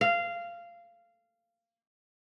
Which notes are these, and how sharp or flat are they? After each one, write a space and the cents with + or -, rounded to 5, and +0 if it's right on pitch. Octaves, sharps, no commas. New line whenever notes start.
F5 -15